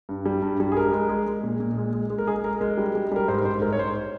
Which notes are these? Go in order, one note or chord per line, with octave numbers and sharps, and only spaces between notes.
G2
G3
G2
G3
G#4
G#3 A#4
G#3
G#3
G#3
A#2
A#2
G#3
G#3
G#3
A#4
G#3 G#4
G#3 A#4
G#3 A#4
G3
G3
G3 A#4
G#2 C5
G#2 C5
G#2 A#4
C#5
G#2 C5